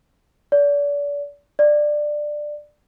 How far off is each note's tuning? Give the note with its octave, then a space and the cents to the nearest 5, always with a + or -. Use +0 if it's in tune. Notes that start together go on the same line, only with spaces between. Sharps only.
D5 -35
D5 +15